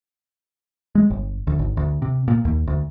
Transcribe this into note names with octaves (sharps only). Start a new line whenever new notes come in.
G#3
G1
D2
G#1
D2
C3
A#2
D#2
D2